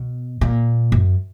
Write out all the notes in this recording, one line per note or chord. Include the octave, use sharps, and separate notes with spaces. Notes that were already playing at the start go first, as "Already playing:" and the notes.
Already playing: B2
A#2
F#2